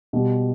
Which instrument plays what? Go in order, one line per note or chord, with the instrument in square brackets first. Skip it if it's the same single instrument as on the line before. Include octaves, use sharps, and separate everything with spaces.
[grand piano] B2 G3